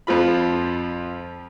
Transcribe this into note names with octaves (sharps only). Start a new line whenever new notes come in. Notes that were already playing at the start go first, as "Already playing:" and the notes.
F2 F3 F4 B5